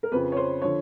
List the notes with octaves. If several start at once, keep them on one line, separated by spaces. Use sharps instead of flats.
A#4
F2 C#3 F3 B4
C#5
C5
D3 F3 C#5